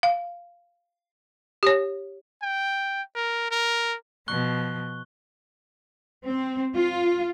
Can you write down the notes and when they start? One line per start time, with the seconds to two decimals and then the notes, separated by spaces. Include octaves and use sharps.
0.03 F5
1.63 G4 C#5
2.43 G5
3.16 A#4
3.51 A#4
4.28 B2 F3 C#6 F#6 G7
6.26 C4
6.76 F4